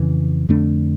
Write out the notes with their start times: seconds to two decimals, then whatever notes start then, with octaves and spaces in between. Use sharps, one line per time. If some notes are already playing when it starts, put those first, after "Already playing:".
Already playing: F2 C#3 E3
0.49 F2 D3 A3 D4